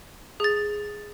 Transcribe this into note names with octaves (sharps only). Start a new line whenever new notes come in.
G#4 A6